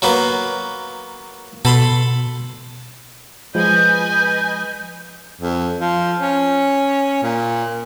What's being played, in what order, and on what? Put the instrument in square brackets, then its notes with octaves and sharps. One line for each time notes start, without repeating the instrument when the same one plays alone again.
[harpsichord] F#3 A#3 B3
[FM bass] B2 [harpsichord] A4 B5 C6
[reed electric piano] F3 G#3 [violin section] B4 D#5 G#5 [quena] G6
[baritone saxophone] F2
F3
C#4
A#2